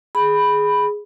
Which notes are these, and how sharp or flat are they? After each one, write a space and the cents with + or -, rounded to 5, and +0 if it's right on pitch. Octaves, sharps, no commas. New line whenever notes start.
G#4 +0 B5 +0